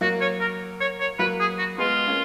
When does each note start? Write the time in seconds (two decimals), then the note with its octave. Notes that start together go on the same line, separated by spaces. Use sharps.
0.01 F#3 A#3 F#4
0.21 C#5
0.41 A#4
0.81 C#5
1.00 C#5
1.19 F#3 A#3 B4
1.40 G#4
1.58 F#4
1.78 G#3 B3 F4
2.08 A#3 C#4